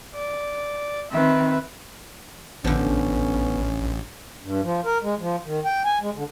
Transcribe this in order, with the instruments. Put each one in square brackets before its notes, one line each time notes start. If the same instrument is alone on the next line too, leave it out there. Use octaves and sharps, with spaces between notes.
[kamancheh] D5
[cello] D#3 C4 [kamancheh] B4 E5
[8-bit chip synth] A1 [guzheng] D3 F3 [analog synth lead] B3 [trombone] C#4
[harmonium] G2
F3
A#4
G#3
F3
D#3
G5
G#5
G#3
D3